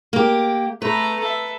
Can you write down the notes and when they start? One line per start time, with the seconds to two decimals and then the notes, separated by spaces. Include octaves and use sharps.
0.13 A#3 G4
0.82 A3 B4 A#5
1.20 A4 E5